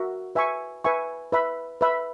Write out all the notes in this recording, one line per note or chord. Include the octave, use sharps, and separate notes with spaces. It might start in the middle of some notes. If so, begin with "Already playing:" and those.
Already playing: F#4 A#4 E5
B4 E5 G#5 C#6
B4 E5 G#5 C#6
B4 E5 B5
B4 E5 B5